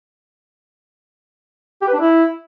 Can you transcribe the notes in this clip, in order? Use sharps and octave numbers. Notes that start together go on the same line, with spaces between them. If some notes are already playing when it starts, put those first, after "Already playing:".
G4
B4
D4
E4